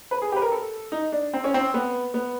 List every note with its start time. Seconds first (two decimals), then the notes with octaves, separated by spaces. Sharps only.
0.11 B4
0.22 G#4
0.32 G4
0.36 B4
0.42 A#4
0.52 A4
0.92 D#4
1.12 D4
1.34 C4
1.44 C#4
1.54 C4
1.74 B3
2.14 B3